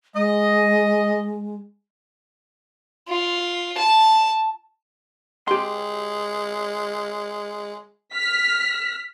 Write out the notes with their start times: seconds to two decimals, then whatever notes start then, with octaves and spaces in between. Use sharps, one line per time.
0.15 G#3 D#5
3.08 F4
3.78 A5
5.48 G#3 G4 C6
8.15 F6 B6